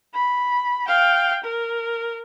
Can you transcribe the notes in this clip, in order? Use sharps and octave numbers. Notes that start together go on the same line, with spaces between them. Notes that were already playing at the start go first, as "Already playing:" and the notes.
B5
F5 G5
A#4